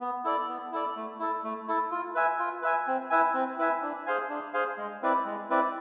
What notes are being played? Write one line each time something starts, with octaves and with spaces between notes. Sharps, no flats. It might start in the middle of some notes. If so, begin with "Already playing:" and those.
B3
E4 A4 D5
B3
E4 A4 D5
A3
E4 A4
A3
E4 A4
F4
B4 E5 G#5
F4
B4 E5 G#5
C4
E4 B4 E5 G#5
C4
E4 B4 E5 G#5
D4
G#4 C5 F5 G#5
D4
G#4 C5 F5 G#5
G#3
C4 E4 B4 D5
G#3
C4 E4 B4 D5